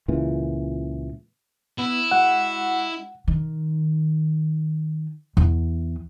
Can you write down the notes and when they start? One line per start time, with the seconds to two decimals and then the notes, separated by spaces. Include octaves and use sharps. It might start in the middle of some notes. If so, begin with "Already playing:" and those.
0.08 C#2 A#2 C#3 E3
1.78 B3 E4
2.11 G#3 F#4 F#5
3.28 D#3
5.37 E2